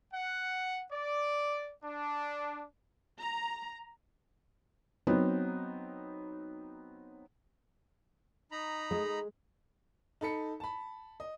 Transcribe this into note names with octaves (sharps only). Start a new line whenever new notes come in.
F#5
D5
D4
A#5
F#3 B3 C4 D#4
D#4 A#5 B5
G#3
D#4 A4 B5 C#7
A5 B5
D#5